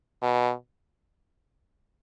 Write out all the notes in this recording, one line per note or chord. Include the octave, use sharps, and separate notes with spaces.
B2